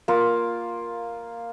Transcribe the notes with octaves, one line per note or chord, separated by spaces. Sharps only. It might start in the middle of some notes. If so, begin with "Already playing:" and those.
A#3 F4